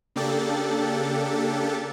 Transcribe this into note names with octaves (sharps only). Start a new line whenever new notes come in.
C#3 A#3 D4 G4 A4 A6